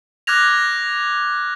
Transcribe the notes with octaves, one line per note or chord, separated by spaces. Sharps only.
D6 F6 F#6 G#6 A#6 F7